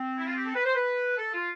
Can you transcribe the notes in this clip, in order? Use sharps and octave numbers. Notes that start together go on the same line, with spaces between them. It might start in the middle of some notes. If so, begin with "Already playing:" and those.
Already playing: C4
E4
F4
G4
A4
B4
C5
B4
A4
F4